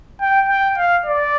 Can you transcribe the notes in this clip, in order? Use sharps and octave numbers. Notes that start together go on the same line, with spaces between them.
G5
G5
F5
D5